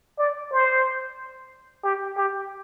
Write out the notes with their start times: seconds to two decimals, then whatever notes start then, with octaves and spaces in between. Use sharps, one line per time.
0.18 D5
0.52 C5
1.83 G4
2.17 G4